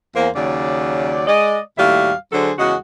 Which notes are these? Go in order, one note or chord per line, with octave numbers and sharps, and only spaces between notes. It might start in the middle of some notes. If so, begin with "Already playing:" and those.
E2 A#3 C5
D#2 C#3 F#3 D5
G#3 D5 D#5
D#2 A2 G3 F#4 E5 F5
D3 F#3 D4 G#4 A4 C5
E2 C#3 G#3 F#4